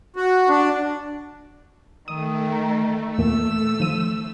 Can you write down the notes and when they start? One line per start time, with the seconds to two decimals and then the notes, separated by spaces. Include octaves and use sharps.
0.16 F#4
0.49 D4
2.08 D#3 A3 D#6
3.18 E2 A#2 E6
3.80 D#3 F3 D#7